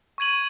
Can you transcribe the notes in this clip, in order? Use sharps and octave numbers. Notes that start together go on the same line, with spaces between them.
C#6 G#6 D#7 F#7